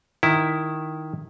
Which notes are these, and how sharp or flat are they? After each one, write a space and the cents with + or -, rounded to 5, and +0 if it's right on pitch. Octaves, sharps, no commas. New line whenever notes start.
D#3 +0 E4 +0